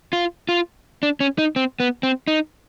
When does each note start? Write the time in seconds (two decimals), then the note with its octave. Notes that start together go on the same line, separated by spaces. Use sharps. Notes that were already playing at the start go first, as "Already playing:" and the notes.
0.13 F4
0.49 F4
1.03 D4
1.20 C#4
1.38 D#4
1.56 C4
1.80 B3
2.03 C4
2.27 D#4